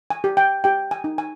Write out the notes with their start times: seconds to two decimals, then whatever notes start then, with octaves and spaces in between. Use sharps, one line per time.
0.10 G#5
0.24 G4
0.37 G5
0.64 G4 G5
0.91 G#5
1.04 D#4
1.18 G#5